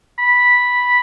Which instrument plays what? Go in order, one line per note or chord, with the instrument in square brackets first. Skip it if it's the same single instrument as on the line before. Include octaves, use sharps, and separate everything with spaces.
[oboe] B5